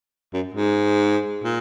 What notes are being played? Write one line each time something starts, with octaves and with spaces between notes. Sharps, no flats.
F#2
G#2
A#2